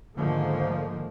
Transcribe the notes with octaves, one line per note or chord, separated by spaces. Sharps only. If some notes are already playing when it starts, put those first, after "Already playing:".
G#2 D3 D#3 F3 A3 A#3